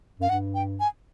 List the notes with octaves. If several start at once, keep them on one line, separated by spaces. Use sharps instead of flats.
F#2 F5
G2 F#5
G5
G#5